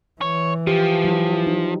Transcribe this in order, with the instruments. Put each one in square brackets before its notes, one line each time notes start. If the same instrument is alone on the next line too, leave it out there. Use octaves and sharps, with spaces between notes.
[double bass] E3 [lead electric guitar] C#5
[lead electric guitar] F3 [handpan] G4
[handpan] F#3 E4
D#4